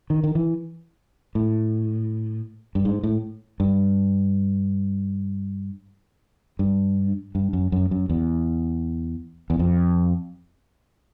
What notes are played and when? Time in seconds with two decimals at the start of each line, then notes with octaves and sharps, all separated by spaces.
0.10 D#3
0.24 D#3
0.35 E3
1.35 A2
2.75 G2
2.85 G#2
3.03 A2
3.60 G2
6.59 G2
7.35 G2
7.53 F#2
7.72 F#2
7.91 F#2
8.10 E2
9.50 E2
9.59 F2